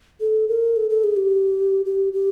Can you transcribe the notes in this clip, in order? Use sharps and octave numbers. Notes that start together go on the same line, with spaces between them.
A4
A#4
A4
A4
G#4
G4
G4
G4